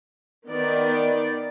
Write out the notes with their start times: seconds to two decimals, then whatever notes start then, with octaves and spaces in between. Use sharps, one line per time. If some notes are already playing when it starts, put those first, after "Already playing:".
0.47 D#3 B3 D#4 D5